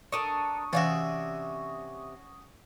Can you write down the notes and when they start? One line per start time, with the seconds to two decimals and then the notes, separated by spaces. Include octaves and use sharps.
0.12 D4 A4 A#4 C#6 D#6
0.73 C3 E3 C#4 F#4 D5 E5 F5